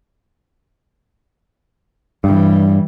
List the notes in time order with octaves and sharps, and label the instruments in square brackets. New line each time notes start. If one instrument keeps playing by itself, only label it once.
[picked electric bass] G2 [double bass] E3 G3